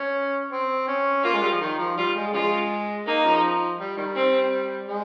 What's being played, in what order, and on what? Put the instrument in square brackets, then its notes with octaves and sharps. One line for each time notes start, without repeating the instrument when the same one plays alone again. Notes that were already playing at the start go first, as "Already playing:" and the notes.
Already playing: [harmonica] C#4
C4
C#4
[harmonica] A#3 [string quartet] F4
[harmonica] G#3
G3
F3
D#3
F3
[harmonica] G3 [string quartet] F4
[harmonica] G#3
[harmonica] C#3 F3 G#3 [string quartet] F4
[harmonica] A#3 [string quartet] D#4
[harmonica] C#3 F3
G3
D#3 G3
[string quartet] C4
[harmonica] G#3